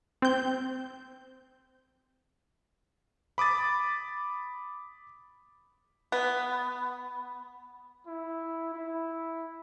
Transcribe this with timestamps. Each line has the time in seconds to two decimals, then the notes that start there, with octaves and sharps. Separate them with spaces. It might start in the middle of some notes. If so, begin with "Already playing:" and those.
0.22 C4 G6
3.38 B5 D6 D#6 A6
6.12 B3
8.07 E4
8.74 E4